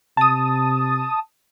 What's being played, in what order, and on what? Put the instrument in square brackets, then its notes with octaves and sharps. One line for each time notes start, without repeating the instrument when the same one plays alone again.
[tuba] C3 [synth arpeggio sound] A5 D#6